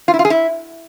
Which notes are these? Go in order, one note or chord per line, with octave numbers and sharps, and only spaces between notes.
F4
E4
F4
G#4
E4